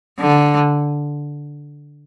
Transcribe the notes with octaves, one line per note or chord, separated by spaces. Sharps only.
D3